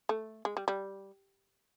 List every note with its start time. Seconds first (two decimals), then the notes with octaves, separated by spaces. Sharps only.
0.09 A3
0.45 G#3
0.57 G3
0.68 G3